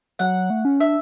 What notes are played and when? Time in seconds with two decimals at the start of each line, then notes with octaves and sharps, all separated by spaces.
0.19 F#3 F#5
0.50 A3
0.65 C#4
0.80 D4 E5